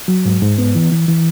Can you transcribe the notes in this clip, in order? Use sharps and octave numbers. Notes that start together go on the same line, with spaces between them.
F#3
G#2
G#2
B3
E3
E3
E3